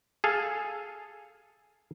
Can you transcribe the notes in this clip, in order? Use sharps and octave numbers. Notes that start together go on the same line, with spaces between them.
G#4 A4 F5